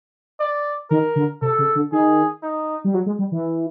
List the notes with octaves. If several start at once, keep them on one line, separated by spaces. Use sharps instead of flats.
D5
D#3 A#4
D3
C3 A4
C#3
D3
D#3 G#4
D#4
G3
F#3
G#3
G3
E3